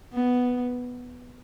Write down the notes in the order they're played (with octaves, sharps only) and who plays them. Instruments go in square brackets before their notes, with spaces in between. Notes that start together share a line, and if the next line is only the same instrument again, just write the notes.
[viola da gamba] B3